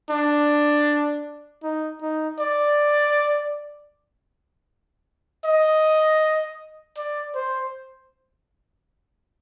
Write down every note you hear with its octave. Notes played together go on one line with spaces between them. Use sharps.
D4
D#4
D#4
D5
D#5
D5
C5